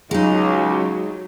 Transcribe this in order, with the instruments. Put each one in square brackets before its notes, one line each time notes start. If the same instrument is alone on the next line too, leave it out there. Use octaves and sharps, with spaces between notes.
[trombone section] C#2 [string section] F#3 [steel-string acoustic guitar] G#3 D#4